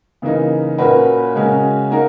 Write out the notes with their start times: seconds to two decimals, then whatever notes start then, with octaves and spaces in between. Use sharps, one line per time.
0.22 C#3 E3 A#3 D#4
0.78 A#2 A#3 C#4 F#4 B4
1.35 C#3 G#3 C#4 F#4 A#4
1.91 A#3 D#4 F#4 A#4